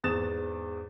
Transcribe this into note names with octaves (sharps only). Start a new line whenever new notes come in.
E2 G#2 D#6 A6 E7